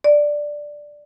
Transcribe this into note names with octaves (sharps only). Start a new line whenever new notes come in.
D5